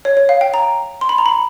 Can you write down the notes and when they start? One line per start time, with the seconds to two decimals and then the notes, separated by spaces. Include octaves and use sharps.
0.05 C#5
0.17 C#5
0.29 F5
0.41 G5
0.54 A#5
1.01 C6
1.09 B5
1.18 A#5
1.26 B5